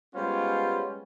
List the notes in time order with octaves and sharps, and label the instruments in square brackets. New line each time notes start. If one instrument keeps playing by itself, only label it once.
[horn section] G3 G#3 B3 C#4 F4 C5